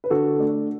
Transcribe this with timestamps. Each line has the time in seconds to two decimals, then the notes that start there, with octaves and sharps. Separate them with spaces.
0.04 B4
0.10 D3 F#4 A4
0.38 A3 D4